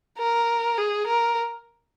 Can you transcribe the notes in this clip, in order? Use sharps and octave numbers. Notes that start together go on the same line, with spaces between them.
A#4
G#4
A#4